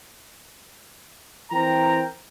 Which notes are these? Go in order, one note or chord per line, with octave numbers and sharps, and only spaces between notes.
E3 C4 A#4 G5 A#5